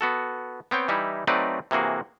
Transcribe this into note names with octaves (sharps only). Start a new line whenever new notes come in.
B3 F#4 A4
B3 C4 C#5 G5
E3 G3 D#4 E4
F#3 A3 C4 D#4 B4 D5
C3 E3 A#3 F#4 G#4